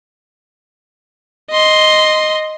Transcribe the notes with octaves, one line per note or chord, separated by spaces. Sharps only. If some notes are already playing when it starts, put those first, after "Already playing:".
D#5 C6